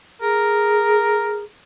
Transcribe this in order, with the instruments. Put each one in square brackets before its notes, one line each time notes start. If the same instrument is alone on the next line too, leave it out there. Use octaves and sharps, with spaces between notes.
[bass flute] G#4 [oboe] A#4